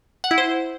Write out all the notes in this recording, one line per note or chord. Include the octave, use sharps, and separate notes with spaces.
F#5
E4
C5